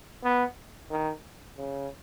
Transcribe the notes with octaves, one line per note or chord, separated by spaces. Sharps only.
B3
D#3
C#3